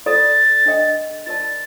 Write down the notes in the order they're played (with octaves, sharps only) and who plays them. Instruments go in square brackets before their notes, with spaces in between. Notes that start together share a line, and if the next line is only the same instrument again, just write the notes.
[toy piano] F4 A4 D5 [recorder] A6
[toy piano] D4 A4 D#5 G5
[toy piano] F4 A#4 D5 A5 [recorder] A6